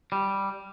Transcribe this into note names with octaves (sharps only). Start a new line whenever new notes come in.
G3